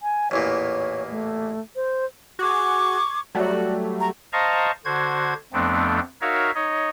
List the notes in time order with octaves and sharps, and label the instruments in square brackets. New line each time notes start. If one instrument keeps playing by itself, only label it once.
[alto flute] G#5
[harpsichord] A1 E2 A#2 [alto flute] C#5
[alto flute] A3
C5
[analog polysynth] F#4 G#4 [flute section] C#6 D6 G#6
[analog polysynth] F#3 G3 A3 [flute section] F#4 D5
[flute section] A#5 C#6
[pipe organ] C5 D#5 F5 A5 A#5 C#6
D3 F#4 C5 G#6
F2 F3 A3 B3 C4 D4
D#4 F#4 A#4 C#5 E5 F5
D#4 C#5 D#5